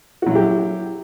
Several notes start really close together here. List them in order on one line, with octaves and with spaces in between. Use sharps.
F#4 F#3 E4 G4